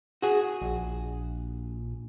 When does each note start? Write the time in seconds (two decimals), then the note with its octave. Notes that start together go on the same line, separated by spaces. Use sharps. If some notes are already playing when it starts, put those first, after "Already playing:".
0.22 F#4 G#4
0.62 A#1